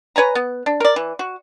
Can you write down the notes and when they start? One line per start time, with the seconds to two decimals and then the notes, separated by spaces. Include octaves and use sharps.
0.16 B4 C#5 G#5 A#5
0.35 B3
0.66 D4
0.80 A#4 D5
0.96 E3
1.19 F#4